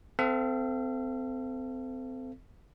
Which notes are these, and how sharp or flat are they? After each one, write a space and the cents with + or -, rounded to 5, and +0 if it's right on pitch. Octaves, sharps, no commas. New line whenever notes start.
C4 -25 A4 +5 F5 -40